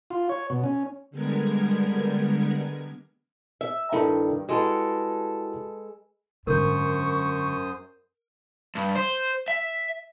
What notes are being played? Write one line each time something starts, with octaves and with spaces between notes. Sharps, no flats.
F4
C#5
B2
C#4
D3 G3 G#3 B3 A#4 G#6
E5
G2 D#3 D4 E4 A4
G#3 E4 F#4 G4 A4 B4
G#1 F#2 D3 A#4 C5 C#6 D#6 G6
G2
C5
E5